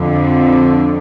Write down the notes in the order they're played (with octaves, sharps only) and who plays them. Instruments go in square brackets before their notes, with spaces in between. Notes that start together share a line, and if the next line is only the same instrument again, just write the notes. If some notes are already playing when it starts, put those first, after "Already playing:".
Already playing: [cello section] F2 D3